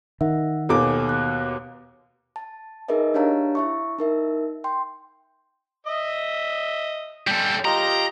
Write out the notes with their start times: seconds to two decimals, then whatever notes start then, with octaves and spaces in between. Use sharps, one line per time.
0.21 D#3 E5 F#5
0.69 D#2 B2 A4 G#5 D6
1.09 F#6
2.36 A5
2.88 D#4 G#4 A#4 B4 D#5 E5
3.14 D4 G4 C#5 F5 A5 A#5
3.55 E4 E5 C#6
3.99 D#4 A#4 E5
4.64 G5 C6
5.86 D#5 E5 D#6
7.28 G3 A4
7.65 F4 G4 D#5 A#5